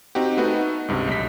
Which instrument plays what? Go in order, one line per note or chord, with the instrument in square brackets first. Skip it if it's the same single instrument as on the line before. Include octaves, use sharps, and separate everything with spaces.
[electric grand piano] C4 D#4 F#4 G4
A3 B3 D#4 F#4 B4
C#2 G2 C3
B1 B6